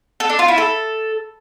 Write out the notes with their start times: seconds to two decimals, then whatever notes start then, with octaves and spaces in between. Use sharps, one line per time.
0.20 A4
0.30 D4
0.39 F4
0.48 E4
0.58 A4